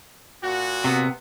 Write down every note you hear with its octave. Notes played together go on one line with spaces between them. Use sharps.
A#2 F#4
C3 B3